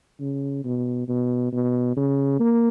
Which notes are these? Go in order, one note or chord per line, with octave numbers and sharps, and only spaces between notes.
C#3
B2
B2
B2
C#3
A#3